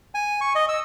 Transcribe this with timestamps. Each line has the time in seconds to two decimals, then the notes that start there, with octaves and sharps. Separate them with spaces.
0.15 G#5
0.41 C#6
0.55 D#5
0.69 E6